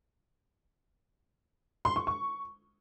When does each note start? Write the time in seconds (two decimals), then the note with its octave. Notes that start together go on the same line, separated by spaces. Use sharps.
1.85 C6
1.96 C#6
2.07 C#6